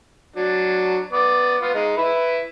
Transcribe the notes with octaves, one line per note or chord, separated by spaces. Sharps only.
F#3 D4
B3 D5
B3 F4
G#3 D#4
E4 B4